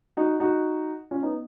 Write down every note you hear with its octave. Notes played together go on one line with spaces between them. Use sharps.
D#4 F#4
D#4 F#4
C#4 F4
B3 D#4